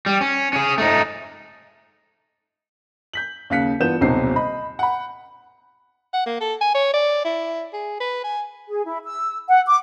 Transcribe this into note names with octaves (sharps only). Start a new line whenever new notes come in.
G3
C#4
C#4 G#4
A3 D#4
G6 B6 F#7
D#2 C#3 F5 F#6 B6 C#7
G2 E3 B3 F4 G6 E7
D#1 B1 C3 C4 D#4 C7
D#5 B5
F#5 B5
F#5
A#3
A4
G#5
C#5
D5
E4
G#4
B4
G#5
G#4
E4
E6
F#5
D6